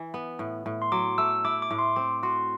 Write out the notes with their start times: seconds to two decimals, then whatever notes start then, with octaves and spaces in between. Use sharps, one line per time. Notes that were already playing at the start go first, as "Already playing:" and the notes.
Already playing: E3
0.14 B3
0.39 A2
0.66 A2
0.82 C6
0.92 F#3 D6
1.18 A3 E6
1.44 E4 D6
1.62 D6
1.71 A2
1.79 C6
1.96 C4 D6
2.23 F#4 C6